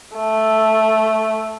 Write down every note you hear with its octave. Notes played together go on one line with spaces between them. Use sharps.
A3